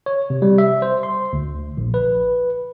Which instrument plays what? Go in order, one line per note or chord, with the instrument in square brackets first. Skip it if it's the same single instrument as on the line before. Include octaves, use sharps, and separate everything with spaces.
[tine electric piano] C#5
C3
G3
E5
C5
C6
D2
A#1
B4